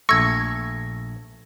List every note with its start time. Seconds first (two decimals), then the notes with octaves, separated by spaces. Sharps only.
0.09 A#1 A3 C#6 E6 G#6 A#6